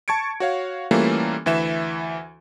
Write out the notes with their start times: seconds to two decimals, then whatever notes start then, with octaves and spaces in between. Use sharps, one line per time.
0.08 A5 C#6 G#6 C#7 D7
0.40 F#4 C#5 F5
0.91 E3 G3 A3 A#3 C#4 F4
1.46 D2 E3 E5 E7